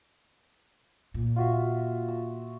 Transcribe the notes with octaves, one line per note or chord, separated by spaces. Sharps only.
A#2
F4 F#4 E5
E6